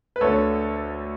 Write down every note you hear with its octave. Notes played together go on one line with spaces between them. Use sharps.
B4
D2 D3 A4 C#5